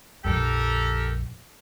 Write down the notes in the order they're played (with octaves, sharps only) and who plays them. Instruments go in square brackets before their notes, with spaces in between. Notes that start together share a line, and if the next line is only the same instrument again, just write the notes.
[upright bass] A#1 F2 [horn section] G4 A4 A#4